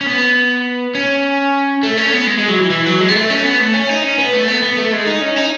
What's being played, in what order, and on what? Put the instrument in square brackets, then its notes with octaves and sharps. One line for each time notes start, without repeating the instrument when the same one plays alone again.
[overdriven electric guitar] C#4
B3
C#4
A3
C#4
B3
G#3
G#3
F#3
E3
E3
F#3
G#3
B3
A3
C#4
B3
A3
C#4
D#4
C#4
B3
A3
B3
B3
A3
G#3
D#4
C#4
D#4